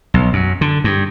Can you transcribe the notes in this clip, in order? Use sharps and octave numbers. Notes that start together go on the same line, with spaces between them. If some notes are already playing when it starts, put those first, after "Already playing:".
B1
F#2
D3
G2